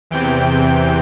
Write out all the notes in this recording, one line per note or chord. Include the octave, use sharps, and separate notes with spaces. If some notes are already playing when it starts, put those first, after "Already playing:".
E2 C3 E3 G5